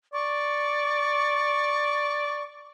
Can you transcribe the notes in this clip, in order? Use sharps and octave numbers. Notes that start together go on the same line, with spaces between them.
D5 C#6